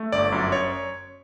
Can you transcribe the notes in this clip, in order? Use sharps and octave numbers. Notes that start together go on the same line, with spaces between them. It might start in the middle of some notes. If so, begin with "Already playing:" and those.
Already playing: A3
G1 D5
F#2
C#5